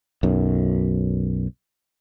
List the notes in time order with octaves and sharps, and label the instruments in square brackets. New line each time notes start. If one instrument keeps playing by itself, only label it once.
[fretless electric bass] B1 F#2